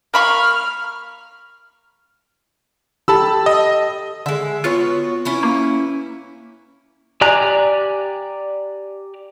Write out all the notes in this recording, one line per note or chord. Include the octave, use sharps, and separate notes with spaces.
A#3 B5 C#6 F6
G4 A4 A5 B5 E6
D#5
D3 G#3 E5
B3 F4 F#4 C#5
C#4 E4 B4
A#3
G4 D5 G#5 A#5 F#6